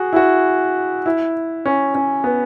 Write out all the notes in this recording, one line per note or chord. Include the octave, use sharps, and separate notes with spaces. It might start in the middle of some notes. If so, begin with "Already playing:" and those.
Already playing: F#4 G#4
E4
F#4
E4
C#4
C#4
B3